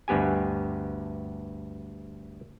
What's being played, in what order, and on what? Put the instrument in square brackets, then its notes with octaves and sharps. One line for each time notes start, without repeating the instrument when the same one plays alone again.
[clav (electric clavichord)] D2 G2 B3 G4 G#5